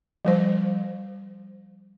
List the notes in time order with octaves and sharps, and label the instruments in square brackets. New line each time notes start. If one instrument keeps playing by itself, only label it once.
[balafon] F3 G3 C5